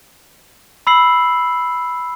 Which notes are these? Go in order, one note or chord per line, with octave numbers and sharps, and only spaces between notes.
B5 E6 C7 F#7